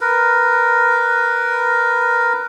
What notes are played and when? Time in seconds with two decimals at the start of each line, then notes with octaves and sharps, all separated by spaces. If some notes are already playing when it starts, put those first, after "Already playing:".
0.01 A#4 B4